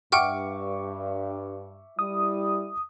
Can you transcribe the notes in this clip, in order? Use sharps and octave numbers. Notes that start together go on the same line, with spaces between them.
G2 E5 F#5 G5 C#6 D6 F6
G3 E4 D#6